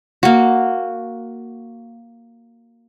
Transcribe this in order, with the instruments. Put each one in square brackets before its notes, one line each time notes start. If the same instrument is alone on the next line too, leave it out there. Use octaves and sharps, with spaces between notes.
[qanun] A#3 F#4